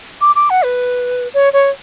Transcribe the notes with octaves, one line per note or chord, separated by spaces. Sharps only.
D6
D6
F#5
B4
C#5
C#5